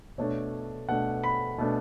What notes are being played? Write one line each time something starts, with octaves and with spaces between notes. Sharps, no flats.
B2 A3 D4 C#5
B2 A3 D4 F#5
B5
B2 A3 D4